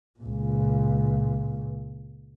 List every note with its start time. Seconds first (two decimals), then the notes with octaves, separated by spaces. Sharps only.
0.20 C#2 A#2